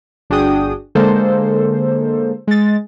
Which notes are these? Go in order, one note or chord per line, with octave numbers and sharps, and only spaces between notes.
G1 D4 F#4 G#4 G5 D#6
D3 G#3 A#3 A4 C5
G#3 A6